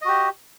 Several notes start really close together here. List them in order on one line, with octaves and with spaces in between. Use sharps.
D#5 F#4 G4